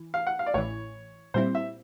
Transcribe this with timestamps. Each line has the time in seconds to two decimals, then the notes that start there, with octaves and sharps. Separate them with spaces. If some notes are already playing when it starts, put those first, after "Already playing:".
Already playing: E3
0.14 F5
0.27 F#5
0.39 F5
0.46 D5
0.54 A1 A2 E3 C#5
1.34 A#2 G3 C4 E4 C5
1.55 E5